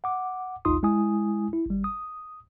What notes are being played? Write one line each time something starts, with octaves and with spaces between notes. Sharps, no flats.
F#5 D6
A1 D#2 D#4 F4 C6 D#6
G#3 E4 G#5 D#6
E4
G#1 G3
D#6